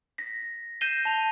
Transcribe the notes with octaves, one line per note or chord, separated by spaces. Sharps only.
A#6 B6
G6 A#6 C7 D#7 E7 G7
A5 F7